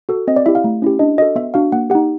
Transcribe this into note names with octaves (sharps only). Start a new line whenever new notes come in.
F#4 A4
C4 D#5
D5
E4 G4 E5
F5
A3
C#4 E4 G4
D4 D#5
F#4 A4 D#5
B3 E5
D4 F#4 F5
A#3 F#5
D#4 G4 F#5